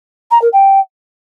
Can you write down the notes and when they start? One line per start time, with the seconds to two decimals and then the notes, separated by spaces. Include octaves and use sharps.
0.30 A#5
0.41 A#4
0.52 G5